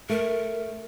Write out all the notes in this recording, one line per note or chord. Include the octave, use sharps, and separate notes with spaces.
A3 A#4